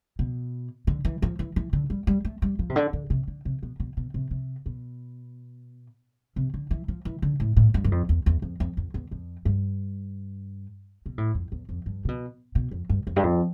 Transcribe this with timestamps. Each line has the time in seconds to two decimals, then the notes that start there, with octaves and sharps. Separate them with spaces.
0.19 B2
0.87 D3
1.05 E3
1.22 F3
1.39 E3
1.56 E3
1.73 D3
1.90 G3
2.07 G3
2.25 A3
2.42 G3
2.59 F3
2.70 C3
2.76 D3
2.93 D3
3.10 C3
3.28 D3
3.45 C3
3.63 B2
3.80 B2
3.97 B2
4.14 C3
4.31 C3
4.66 B2
6.36 C3
6.54 D3
6.71 E3
6.88 F3
7.05 E3
7.22 D3
7.40 A2
7.56 A2
7.74 G2
7.84 G2
7.92 F2
8.09 E2
8.26 E2
8.42 F2
8.60 F2
8.77 F2
8.94 E2
9.11 F2
9.45 G2
11.06 B2
11.18 A2
11.35 F2
11.52 E2
11.69 F2
11.86 G2
12.05 C3
12.08 B2
12.55 B2
12.71 F2
12.89 G2
13.07 F2
13.16 G2
13.23 F2